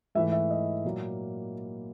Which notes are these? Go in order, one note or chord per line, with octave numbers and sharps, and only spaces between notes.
G#2 E3 A3 E5
E5
D#5
A#2 F#3 A#3